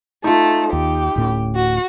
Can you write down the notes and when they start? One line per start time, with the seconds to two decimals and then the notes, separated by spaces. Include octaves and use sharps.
0.24 A3 D#4 F4
0.73 D#2 G4
1.16 D1 A2 C#4
1.55 F#4